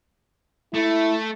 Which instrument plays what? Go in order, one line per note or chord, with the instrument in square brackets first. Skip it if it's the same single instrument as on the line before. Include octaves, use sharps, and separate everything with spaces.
[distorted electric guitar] A3 [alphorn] E4